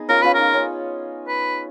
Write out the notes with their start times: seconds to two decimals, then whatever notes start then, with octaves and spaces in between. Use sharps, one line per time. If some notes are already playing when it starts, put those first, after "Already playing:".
Already playing: B3 D#4 G#4
0.09 C#4 F4 A#4
0.22 C#4 F4 B4
0.34 D#4 A#4
0.54 C#4
1.28 B4